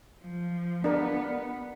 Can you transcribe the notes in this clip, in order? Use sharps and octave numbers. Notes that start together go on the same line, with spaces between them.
F3
B3 D4 A#4